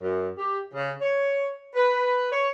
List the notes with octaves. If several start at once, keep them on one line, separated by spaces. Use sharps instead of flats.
F#2
G4
C#3
C#5
B4
C#5